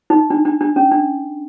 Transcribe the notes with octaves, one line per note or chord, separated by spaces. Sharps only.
D#4
D4
D4
D4
C#4
D4